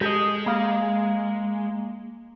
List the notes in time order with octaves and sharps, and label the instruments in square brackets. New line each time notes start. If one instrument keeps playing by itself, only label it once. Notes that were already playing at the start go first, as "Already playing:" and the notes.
[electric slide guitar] G#3 [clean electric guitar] G4 A4 D#5
[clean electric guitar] A#3 F5